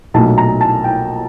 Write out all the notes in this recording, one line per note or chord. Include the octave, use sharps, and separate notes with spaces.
B1 A#2 F#3 A3 A5
A#5
A5
G5